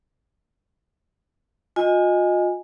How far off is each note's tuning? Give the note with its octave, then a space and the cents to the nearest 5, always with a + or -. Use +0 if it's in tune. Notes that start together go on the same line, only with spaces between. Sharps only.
F4 +40 D#5 +0 G#5 -10